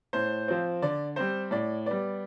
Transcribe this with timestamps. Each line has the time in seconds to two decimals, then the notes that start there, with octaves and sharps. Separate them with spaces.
0.13 A2 C5
0.48 F3 C4
0.82 D3 D5
1.16 G3 C4 C5
1.51 A2 D5
1.86 G3 B3 D5